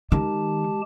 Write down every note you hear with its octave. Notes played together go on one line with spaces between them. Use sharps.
D#3 G#3 G4 A5